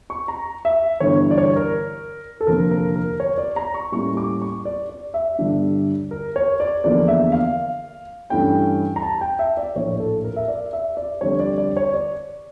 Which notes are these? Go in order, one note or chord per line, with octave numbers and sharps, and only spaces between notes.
C#6
A#5
E5
G1 G2 E3 C#5
D5
C#5
A#4
A4
F1 F2 D3 F3 A#3 A#4
A#4
A#4
C#5
D5
A#5
C#6
A2 G3 A#3 C#4 E4 C#6
D6
C#6
D5
D5
E5
G1 G2 D3 G3 D4
A#4
C#5
D5
E2 D3 F3 A#3 D4 D5
E5
F5
G2 E3 A3 C#4 E4 G5
A#5
A5
G5
E5
D5
A#1 A2 F3 A#3 C#5
A4
A#4
E5
D5
E5
D5
F2 D3 G3 C#5
D5
D5
C#5
D5